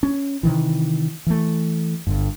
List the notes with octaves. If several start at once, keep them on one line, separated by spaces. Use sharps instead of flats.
C#4
C3 D#3 E3
E3 A3
G1 G2